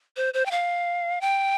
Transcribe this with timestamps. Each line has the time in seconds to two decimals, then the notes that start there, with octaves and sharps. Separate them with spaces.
0.17 C5
0.34 C5
0.46 G5
0.51 F5
1.21 G5